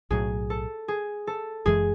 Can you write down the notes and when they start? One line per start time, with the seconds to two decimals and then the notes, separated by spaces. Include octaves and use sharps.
0.11 B1 A2 F#3 G#4
0.50 A4
0.88 G#4
1.27 A4
1.66 F#1 F#2 E3 G#3 G#4